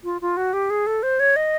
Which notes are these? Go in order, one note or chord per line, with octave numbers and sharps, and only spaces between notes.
F4
F4
F#4
G4
G#4
A4
C5
C#5
D#5